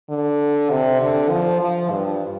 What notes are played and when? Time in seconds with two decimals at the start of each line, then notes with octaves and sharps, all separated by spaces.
0.10 D3
0.70 C3
1.01 D3
1.30 F3
1.61 F3
1.91 G2